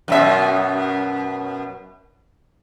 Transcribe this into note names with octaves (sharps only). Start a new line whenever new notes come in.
F#2 B2 E5